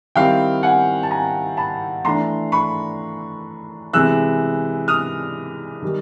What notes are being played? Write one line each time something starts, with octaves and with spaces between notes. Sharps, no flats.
D#3 G3 C4 E4 F5 G5
F#5 G#5
A5
G#5 A#5
A5 B5
E3 A3 D4 A#5 C6
B5 C#6
C3 E3 G#3 E6 F#6
D#6 F6
D#3 G3